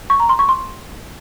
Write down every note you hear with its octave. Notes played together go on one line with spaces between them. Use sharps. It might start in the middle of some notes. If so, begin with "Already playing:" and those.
C#6
A#5
C6
C#6
C6